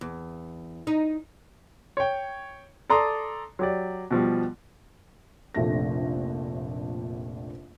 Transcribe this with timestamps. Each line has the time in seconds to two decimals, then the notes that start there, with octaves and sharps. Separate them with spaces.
0.01 E2
0.87 D#4
1.97 C#5 G5
2.90 A4 D5 A#5 C6 D#6
3.59 F#3 G4 D5
4.11 B2 F3 G3
5.55 F1 A#1 C3 A3 D4 A#6